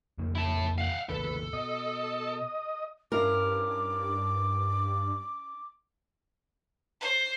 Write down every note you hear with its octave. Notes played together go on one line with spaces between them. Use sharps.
F2 C#3 A#3
E4 A5
F5 F#5
G#1 D#2 C#3 A4 B4
B2 D#5
G2 C#4 E4 A#4 F5 D6
C5